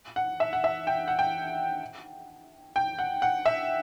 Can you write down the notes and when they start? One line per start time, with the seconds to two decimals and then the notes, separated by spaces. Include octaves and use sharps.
0.16 F#5
0.40 E5
0.53 F#5
0.64 E5
0.87 G5
1.08 F#5
1.19 G5
2.76 G5
2.99 F#5
3.22 F#5
3.46 E5